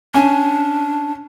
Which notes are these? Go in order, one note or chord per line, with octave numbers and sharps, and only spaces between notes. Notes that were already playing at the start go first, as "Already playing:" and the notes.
C#4 D4 G#5